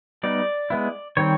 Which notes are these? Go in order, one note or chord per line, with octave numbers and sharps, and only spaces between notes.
G3 B3 D#4 D5
G#3 B3 E4
D#3 G3 C4 C#5